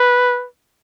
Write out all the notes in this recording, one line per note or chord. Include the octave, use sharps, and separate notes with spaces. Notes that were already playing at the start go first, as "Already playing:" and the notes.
Already playing: B4